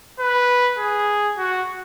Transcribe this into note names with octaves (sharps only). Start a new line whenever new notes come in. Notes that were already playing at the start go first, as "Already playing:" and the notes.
B4
G#4
F#4